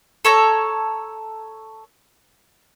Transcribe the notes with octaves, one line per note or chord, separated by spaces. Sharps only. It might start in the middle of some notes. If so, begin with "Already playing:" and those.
A4 C#5 A#5